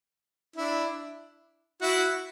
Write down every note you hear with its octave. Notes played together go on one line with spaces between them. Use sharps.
D4 E4
E4 F#4